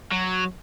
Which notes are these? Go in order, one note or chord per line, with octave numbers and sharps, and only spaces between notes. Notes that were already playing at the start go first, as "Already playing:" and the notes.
F#3